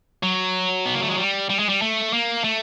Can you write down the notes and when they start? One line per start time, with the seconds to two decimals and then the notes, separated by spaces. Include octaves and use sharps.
0.23 F#3
0.86 B3
0.95 A#3
1.02 A3
1.10 G#3
1.18 G3
1.50 G3
1.59 G#3
1.69 G3
1.82 A3
2.13 A#3
2.44 A3